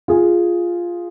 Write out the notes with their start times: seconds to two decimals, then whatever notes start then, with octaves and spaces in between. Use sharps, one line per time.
0.08 F4 G#4